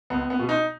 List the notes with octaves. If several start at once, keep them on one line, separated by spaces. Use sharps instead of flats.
C#2 B3
B3
B2
D#4